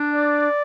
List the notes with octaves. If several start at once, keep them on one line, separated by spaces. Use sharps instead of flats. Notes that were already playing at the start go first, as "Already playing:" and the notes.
Already playing: D4
D5